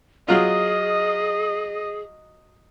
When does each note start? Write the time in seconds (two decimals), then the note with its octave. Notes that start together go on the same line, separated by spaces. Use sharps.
0.28 F#3 F4 G#4 D#5